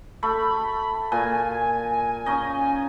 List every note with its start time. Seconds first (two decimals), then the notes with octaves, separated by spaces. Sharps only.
0.23 A3 B5
1.12 A#2 G#5
2.26 C#4 D#4 D#5